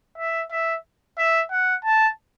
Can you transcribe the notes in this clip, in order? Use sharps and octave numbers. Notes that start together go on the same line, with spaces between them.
E5
E5
E5
F#5
A5